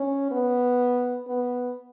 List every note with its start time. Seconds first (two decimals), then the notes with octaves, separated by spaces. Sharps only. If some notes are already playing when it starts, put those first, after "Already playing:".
Already playing: C#4
0.31 B3
1.27 B3